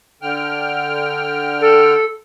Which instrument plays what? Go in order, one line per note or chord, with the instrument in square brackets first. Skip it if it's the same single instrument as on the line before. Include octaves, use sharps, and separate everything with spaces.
[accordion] D3 G5 F6
[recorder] A4